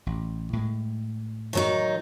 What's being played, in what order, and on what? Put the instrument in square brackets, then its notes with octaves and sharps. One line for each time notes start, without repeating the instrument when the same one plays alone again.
[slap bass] A1
A2 G#3
[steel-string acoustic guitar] D#3 F#3 D#4